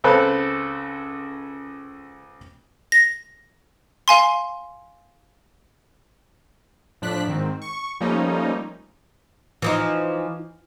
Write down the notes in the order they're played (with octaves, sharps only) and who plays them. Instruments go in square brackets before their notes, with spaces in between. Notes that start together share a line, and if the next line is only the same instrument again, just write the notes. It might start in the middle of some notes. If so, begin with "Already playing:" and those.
[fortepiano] C#2 C#3 C4 A4 B4 B5
[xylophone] A#6
F5 G#5 C6
[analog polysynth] A2 F3 D4 F#6 B6
G#2 D#3 C4
C#6
F3 G3 A3 A#3 C#4 D#4
[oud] E3 F3 D#4